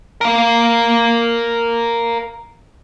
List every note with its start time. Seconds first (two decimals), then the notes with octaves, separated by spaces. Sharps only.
0.21 A#4 F5